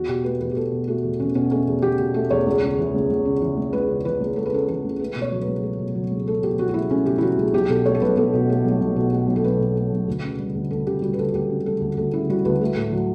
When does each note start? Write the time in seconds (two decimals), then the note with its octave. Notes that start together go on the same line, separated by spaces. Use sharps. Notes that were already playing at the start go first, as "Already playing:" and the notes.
Already playing: E2 F#4
0.08 B2 G4
0.24 A3 B4
0.41 E2 B4
0.51 G4
0.56 E2 A4
0.71 B2
0.87 A3 F#4
1.04 E2
1.20 E2 C#4
1.35 B2 C#4
1.51 A3 C#4
1.67 E2
1.82 E2 G4
1.99 B2
2.14 A3 A4
2.30 E2 C#5
2.46 C#2
2.63 C#3
2.78 E3
2.94 C#2
3.10 C#2
3.25 C#3
3.42 E3
3.57 C#2
3.73 C#2 B4
3.89 C#3
4.05 E3 B4
4.20 C#2
4.36 C#2 A4
4.46 B4
4.53 C#3 A4
4.68 E3 A4
4.84 C#2
5.00 A3 B4
5.16 B2
5.22 C#5
5.32 F#3
5.42 B4
5.48 C#2
5.63 A3
5.79 B2
5.95 F#3
6.11 C#2
6.27 A3 A4
6.43 B2 G4
6.59 F#3 F#4
6.69 F#4
6.74 C#2 E4
6.91 A3 C#4
7.06 B2 G4
7.18 E4
7.22 F#3 F#4
7.37 C#2
7.54 B1 G4
7.69 B2 A4
7.85 A3 C#5
7.95 A4
8.01 B1 B4
8.17 B1 A4
8.34 B2
8.49 A3
8.65 B1
8.81 B1
8.96 B2
9.12 A3
9.28 B1
9.36 A4
9.44 B1 B4
9.59 B2
9.76 A3
9.92 B1
10.07 D2
10.24 C#3
10.39 G3
10.55 D2
10.71 D2 A4
10.87 C#3 G4
11.02 G3 F#4
11.13 B4
11.18 D2 A4
11.34 D2 G4
11.50 C#3
11.66 G3 A4
11.81 D2
11.97 D2 A4
12.13 C#3 E4
12.30 G3 F#4
12.45 D2 B4
12.61 A3
12.76 A2
12.92 F#3